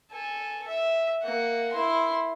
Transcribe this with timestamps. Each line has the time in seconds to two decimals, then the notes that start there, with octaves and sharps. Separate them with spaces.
0.12 A4 G#5
0.68 E5
1.22 A#3 F#5
1.72 E4 C6